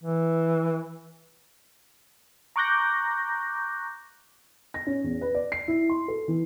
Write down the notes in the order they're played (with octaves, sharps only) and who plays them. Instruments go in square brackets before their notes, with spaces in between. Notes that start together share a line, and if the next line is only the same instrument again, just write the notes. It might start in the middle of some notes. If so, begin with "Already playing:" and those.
[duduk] E3
[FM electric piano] A#5 C#6 D6 F#6 G6 A#6
[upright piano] A#6
C#4
E2
B4
D5
C7
E4
C6
A4
E3